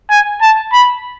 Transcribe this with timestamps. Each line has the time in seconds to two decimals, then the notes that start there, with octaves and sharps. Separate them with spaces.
0.11 G#5
0.42 A5
0.73 B5